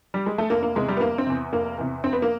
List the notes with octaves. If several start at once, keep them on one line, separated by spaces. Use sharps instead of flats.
G3
G#3
A3
F1 A#3
A#3
E2 C3 G#3
G3
B3
F1 A#3
C4
E2 C3
F1 A#3
E2 C3
F1 C4
B3
A#3